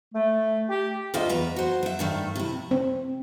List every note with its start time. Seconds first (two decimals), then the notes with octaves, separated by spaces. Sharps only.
0.14 A3
0.70 G4
1.14 D2 A#3 F4 D#5 E5
1.29 E2 B4 A#5
1.56 F#4 C5
1.83 F#3 E5
1.99 G2 D#3 A3
2.36 C3 E4
2.71 C4